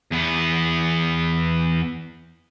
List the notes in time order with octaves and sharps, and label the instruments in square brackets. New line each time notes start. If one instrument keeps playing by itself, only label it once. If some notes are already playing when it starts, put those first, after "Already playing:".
[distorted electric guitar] E2 B3